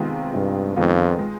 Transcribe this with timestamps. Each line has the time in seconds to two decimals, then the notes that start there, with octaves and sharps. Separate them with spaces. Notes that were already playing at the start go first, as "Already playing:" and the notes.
Already playing: C3 D#3 G#3 B3 F4
0.34 G2 C3
0.76 F2 D#3 G#3 B3 F4
1.19 G#3